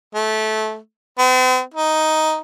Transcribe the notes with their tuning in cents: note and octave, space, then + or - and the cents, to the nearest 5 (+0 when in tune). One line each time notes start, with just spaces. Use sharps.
A3 -20
C4 -45
D#4 +5